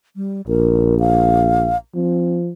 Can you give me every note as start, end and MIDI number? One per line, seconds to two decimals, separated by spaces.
0.16 0.42 55
0.48 1.75 34
0.48 0.98 70
1.00 1.77 77
1.95 2.51 53
1.95 2.38 60